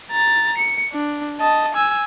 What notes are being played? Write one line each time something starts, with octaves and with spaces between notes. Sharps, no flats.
A#5 A6
C#7
D4
D#5 A5
G#5 E6